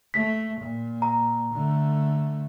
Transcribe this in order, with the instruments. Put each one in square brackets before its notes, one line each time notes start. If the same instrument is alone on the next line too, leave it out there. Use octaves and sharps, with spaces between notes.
[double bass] A3 [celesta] B6
[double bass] A#2
[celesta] A#5
[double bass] D3 A3